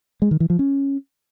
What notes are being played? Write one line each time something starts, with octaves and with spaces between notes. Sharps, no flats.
G#3
D#3
E3
F3
C#4